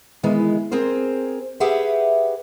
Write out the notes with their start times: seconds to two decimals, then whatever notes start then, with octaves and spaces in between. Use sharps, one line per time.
0.23 D#3 E3 G#3 B3
0.71 C4 G#4 A#4 C5
1.60 G4 G#4 B4 E5 F#5